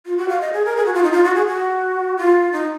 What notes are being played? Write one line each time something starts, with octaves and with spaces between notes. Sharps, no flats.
F4
F#4
F5
D#5
G#4
A#4
G#4
F#4
F4
D#4
F4
F#4
G#4
F#4
F4
D#4